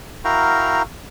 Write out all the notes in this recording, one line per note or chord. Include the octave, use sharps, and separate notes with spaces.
E4 F#4 A#4 F5 G5 A#5